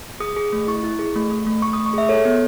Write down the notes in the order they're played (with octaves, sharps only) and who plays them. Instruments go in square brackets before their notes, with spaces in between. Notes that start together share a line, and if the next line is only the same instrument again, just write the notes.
[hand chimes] G#4 D#6
G#4
A3
E4 C#6
E4
G#4
A3
A3
A3
A3 C#6
A3 D#6
C#6
G#4 E5
A4 C#5
B3